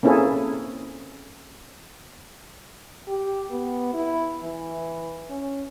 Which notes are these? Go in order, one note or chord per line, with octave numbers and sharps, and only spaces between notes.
A#3 C4 C#4 E4 G#4 A4
G4
B3
E4
E3
C#4